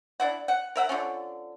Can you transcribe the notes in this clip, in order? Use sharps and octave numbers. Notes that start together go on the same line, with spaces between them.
D4 E4 F#5
F#5
A#4 E5 F#5
D3 F3 C#4